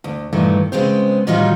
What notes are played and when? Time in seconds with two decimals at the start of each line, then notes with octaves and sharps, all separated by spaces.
0.04 D2
0.33 G2 A#2 D#3 E3 A3
0.72 C#3 G#3 B3 C4 C5
1.27 A2 D#3 G3 D#4 F4 F#4